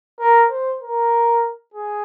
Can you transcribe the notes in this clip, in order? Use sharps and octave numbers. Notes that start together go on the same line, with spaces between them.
A#4
C5
A#4
G#4